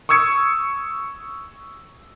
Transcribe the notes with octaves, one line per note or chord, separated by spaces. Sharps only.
C#6 D#6 E6 G#6 C#7